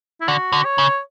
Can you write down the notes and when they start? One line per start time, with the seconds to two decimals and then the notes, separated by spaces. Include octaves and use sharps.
0.21 E4
0.28 D3 F#4
0.52 D3
0.65 C#5
0.78 C#3